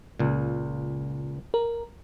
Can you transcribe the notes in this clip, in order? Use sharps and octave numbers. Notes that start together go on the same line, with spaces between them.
C#2 A#2
A#4